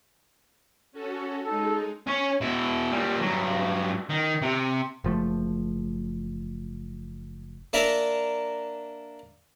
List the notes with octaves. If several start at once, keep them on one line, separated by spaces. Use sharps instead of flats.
C#4 F#4 A4
G#3 D#4 A4
C#4 C#5
B2 E4
A#2 G3
G2 F#3
D#3
C3
F#1 F3 A3
A#3 D4 A#4 E5 A#5